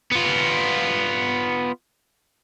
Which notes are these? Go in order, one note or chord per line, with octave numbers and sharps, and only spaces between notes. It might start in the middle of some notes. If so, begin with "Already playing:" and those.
B3 F4